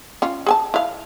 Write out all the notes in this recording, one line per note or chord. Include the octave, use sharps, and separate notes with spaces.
C#4 F4
G#4 G#5 A5
E4 F5